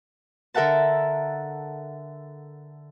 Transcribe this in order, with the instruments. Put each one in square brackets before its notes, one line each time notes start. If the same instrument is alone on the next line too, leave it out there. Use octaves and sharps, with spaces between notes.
[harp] D3 A4 A#4 E5 F#5 A5